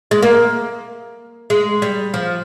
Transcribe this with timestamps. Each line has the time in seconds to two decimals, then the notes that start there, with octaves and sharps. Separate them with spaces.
0.11 G#3
0.22 A#3
1.50 G#3
1.82 G3
2.14 F3